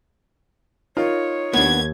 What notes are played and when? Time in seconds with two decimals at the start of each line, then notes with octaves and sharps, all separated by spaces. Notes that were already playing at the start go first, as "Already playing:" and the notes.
0.97 D#4 F4 A#4 C#5
1.54 D#2 B3 D4 G#6